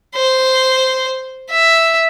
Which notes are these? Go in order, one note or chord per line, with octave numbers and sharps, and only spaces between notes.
C5
E5